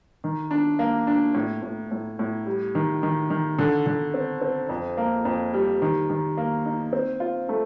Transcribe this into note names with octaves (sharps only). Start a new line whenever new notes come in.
D#3
D4
A#3
D4
A2
A2
A2
A2
G3
D#3
D#3
D#3
D3
D3
C4
C4
F2
A#3
F2
G3
D#3
D#3
A#3
D#4
C4
F4
A3